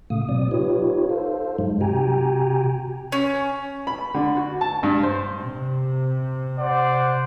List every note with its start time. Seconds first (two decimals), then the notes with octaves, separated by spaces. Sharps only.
0.10 A2 C#3 A3 F5 D#6
0.29 B2 F#3 C4 D5 D#6
0.51 D#4 F4 G4 B4 C#5
1.10 A4 C5 F5
1.58 G2 F#3 G#3 D#4
1.81 C3 F#4 G4 G5 G#5 A#5
3.12 C#4
3.87 B5
4.14 D3
4.37 F#4
4.61 A5
4.83 G2
5.03 C5
5.40 C3
6.59 C5 D5 F#5